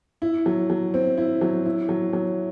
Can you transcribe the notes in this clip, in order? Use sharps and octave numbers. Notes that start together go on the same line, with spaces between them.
E4
F#3
F#3
C4
E4
F#3
E4
F#3
F#3